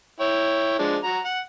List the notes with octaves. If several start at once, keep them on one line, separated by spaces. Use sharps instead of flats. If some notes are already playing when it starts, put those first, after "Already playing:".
E4 C#5 G5
F3 G#3 D4
F#4 A#5
F#5